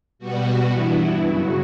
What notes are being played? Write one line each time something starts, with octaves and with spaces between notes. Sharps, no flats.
B2 G3 B3 F#4
G2 E3 B3 E4
F#2 C#3 F#3 F#4